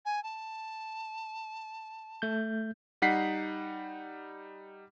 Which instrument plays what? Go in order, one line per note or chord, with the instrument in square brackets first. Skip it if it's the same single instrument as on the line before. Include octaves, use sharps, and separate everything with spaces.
[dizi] G#5
A5
[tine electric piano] A3 G6
[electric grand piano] G3 D#4 F#5 B6 C7